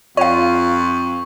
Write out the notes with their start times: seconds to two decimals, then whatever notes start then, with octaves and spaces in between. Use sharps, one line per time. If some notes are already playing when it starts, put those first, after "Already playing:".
0.17 F2 F4 C#5 F5 C#6